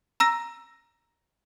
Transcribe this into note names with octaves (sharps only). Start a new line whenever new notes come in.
A#5 E6 A#6